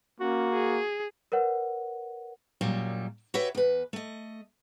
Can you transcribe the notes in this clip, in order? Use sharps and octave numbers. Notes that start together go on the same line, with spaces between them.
A#3 C#4 F#4
G#4
A#4 B4 C#5 F#5
F#2 A#2 F#3 G3
F#4 G4 B4 C#5 E5
E2 B4
A3 D#5